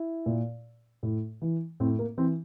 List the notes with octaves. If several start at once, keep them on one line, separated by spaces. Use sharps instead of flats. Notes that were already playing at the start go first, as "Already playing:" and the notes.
Already playing: E4
A#2
A2
E3
A2 C4
A#3
E3 C4